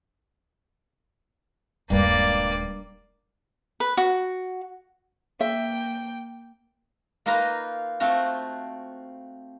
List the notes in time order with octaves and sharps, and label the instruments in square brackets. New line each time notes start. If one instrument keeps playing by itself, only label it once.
[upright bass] D#1 G#3 [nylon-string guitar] G2 [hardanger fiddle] A#3 D5
[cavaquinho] B4
F#4
[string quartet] A#3 G5 [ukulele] E5
[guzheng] A#3 D#4 F4 A#4 B4 A#5
A3 C4 F4 F#4